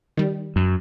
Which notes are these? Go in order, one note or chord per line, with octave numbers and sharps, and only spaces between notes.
D#3 G3
F#2